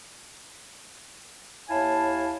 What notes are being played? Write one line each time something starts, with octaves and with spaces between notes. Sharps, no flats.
D#2 E4 C#5 F5 G#5 A5